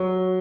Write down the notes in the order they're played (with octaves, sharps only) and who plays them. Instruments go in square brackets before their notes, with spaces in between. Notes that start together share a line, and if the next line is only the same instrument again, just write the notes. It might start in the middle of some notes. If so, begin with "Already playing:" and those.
Already playing: [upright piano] F#3